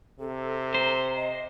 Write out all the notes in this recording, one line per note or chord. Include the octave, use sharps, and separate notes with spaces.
C3 A4
C5 A#5
D#5